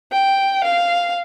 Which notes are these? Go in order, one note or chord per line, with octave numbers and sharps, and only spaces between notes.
G5
F5